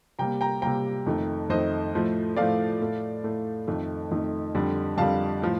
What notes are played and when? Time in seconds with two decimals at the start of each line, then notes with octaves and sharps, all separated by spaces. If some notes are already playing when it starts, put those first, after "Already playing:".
0.19 C3 G3 A#3 G5 A#5
0.41 G5 A#5
0.62 C3 G3 A#3 G5 A#5
1.06 F2 D#3 A3
1.50 F2 D#3 A3 C5 D#5
1.94 A2 F3 A3
2.36 A2 F3 A3 D5 F5
2.80 A2 A3
3.24 A2 A3
3.68 F2 D#3 A3
4.11 F2 D#3 A3
4.55 F2 D3 G3
4.97 F2 D3 G3 F5 A5
5.42 A2 F3